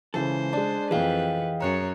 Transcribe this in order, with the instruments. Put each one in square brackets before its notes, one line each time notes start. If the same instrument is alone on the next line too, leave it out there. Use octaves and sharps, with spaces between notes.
[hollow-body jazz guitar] C#2 G2 A4 [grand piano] C#3 E3 [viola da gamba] C5
[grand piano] G#3 D4 [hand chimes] D5 A5
[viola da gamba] F2 B4 [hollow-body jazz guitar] E3 [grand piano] G#4 [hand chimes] D#5 F5 G5
[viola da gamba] F#2 C#5 [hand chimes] A#5 F#6 C#7